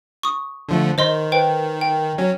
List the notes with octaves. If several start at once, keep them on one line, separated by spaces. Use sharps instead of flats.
C#6 D#6
D3 F3 A3
D#3 C5 D#5 C6
B4 C5 G5
G5
F#3 C#4